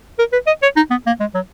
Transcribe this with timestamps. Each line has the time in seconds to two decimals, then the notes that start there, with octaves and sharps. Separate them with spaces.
0.19 A#4
0.33 B4
0.47 D#5
0.63 C#5
0.76 D#4
0.90 B3
1.06 A#3
1.20 G#3
1.34 F#3